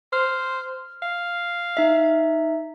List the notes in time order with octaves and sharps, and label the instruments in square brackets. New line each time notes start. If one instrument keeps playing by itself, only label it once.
[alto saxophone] C5 [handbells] F6
[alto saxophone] F5
[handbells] D#4 E5